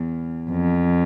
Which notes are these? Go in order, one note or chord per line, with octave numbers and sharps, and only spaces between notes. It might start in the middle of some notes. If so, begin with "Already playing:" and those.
Already playing: E2
F2